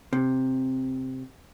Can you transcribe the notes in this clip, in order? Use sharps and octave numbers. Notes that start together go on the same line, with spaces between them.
C3